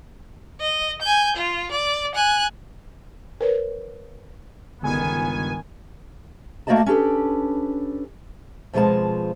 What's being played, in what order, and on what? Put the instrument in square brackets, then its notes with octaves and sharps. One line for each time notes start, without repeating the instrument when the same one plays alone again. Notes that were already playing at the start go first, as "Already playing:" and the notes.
[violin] D#5
G#5 G6
F4
D5
G#5 F#6
[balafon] A#4 B4 C#5
[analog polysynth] G1 C#2 G#5 [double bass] D#3 B3
[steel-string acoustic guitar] A3 A#3 F#4 D5 D#5 A5
C#4 D4 G4 A4 B4
F2 B2 F3 G#3 F4 A5